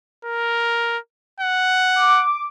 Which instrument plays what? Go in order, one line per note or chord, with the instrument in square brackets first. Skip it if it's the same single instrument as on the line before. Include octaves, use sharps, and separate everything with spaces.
[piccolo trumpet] A#4
F#5
[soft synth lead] D6